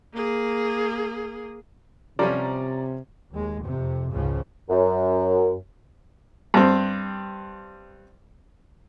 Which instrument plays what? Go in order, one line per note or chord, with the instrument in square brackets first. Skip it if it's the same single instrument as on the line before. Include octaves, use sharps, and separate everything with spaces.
[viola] A#3 G#4
[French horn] C3 [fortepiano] F3 G3 C#4 [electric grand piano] D5 A#5
[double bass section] D#2 G#3
F2 C3
F1 C#2 G#2 C#3 F3
[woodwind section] F#2
[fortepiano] G2 C4